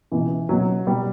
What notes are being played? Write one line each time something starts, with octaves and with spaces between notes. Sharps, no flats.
C#2 B2 E3
C#2 B2 F#3
B2 G3